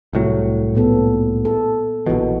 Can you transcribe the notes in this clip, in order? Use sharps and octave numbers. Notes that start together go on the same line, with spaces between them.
C2 A2 F#3
A#2 B3 A4
A4
A#1 B2 E3 F#4